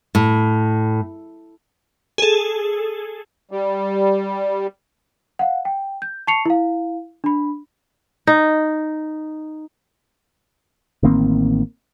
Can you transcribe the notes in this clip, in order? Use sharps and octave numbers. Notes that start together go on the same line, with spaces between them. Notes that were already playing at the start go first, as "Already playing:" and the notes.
A2
G#4 A4
G3
F5 F#5
G5
G6
A5 C#6 C7 C#7 F7
E4 F5
D4 B5
D#4
A1 D#3 A#3 C4